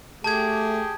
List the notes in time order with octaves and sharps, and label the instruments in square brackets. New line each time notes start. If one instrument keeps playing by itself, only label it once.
[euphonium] A3 [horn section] G4 G#4 [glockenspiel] A5 G#6